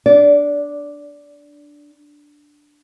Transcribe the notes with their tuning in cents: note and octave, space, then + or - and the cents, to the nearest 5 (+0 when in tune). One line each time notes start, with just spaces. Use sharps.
D4 +0 D5 -20